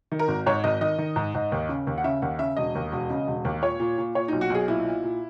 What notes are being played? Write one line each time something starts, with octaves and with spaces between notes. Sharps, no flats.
D#3
A#4
G#1
G#2 C#5
G#1 D#5
D#3 D#5
D#3
G#2
G#2
D#2
C#3
D#2
F#5
C#3 E5
D#2 F#5
C#3 E5
E1 D#5
D#2
E1
C#3
E1
D#2
A#2 C#5
A#2
A#2
A#2 C#5
B1 D#4
F#4
B1 G#4
A#2 E4
A#2
A#2